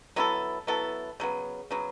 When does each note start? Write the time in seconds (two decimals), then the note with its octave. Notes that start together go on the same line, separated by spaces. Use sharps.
0.16 F#3 B3 E4 A4
0.67 F#3 B3 E4 A4
1.20 C#3 F#3 B3
1.71 C#3 F#3 B3